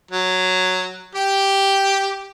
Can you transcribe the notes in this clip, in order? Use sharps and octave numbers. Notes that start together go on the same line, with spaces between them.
F#3
G4 G5